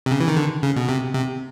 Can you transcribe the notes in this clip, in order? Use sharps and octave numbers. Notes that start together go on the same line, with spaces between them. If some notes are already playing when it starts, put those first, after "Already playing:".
C3
C#3
E3
D#3
D3
C#3
B2
C3
C3